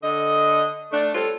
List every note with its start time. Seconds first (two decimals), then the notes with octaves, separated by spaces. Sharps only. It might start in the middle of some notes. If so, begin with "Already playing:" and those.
0.03 D3 D#5
0.91 A3 D4
1.14 G3 C4 F4 A4 C#5